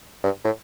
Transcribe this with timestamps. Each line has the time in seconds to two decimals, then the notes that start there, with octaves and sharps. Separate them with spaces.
0.24 G2
0.44 A2